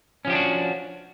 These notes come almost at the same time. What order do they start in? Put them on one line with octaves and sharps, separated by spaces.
C#4 F3 G4 D4 F#4